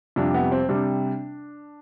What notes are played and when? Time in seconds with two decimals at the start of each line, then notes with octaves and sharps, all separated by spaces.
0.16 F2 C3 G3 D4
0.34 B3
0.52 C4
0.69 C3 G3 D4